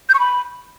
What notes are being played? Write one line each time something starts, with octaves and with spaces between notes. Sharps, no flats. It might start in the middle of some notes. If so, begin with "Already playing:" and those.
G6
C#6
B5